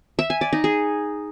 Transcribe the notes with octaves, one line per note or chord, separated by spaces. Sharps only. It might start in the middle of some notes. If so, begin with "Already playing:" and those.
E5
G#5
D5
D#4
G#4